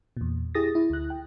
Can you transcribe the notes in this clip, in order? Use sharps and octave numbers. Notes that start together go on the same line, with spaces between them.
E2 A#2
E4 G4 G#4 D#6 A6 A#6
E4
D2 F#6
G5